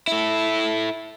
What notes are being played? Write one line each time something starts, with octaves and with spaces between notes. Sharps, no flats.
E4 A4